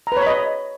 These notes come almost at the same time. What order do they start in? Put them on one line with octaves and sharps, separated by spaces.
A#5 B4 C#5 B5 D#5